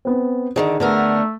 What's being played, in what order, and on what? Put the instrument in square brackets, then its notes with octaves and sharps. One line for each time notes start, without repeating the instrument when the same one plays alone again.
[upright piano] B3 C4
[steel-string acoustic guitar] D3 D#3 F#3 [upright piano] G#4
[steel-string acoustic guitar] D3 B3 A#4 [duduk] A3